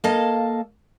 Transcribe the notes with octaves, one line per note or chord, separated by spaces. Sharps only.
A#3 A4 D#5 F5 A5